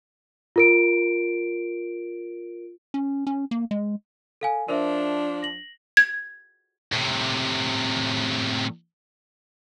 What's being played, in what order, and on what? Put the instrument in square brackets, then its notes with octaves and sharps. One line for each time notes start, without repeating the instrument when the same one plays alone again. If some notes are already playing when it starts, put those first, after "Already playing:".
[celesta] F4 A#4 D7
[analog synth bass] C#4
C#4
A#3
G#3
[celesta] A4 F5 G#5
[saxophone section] F3 D4 [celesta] A#4 C5 E5
[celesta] A#6 F#7
[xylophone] G#6
[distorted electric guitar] A2 C3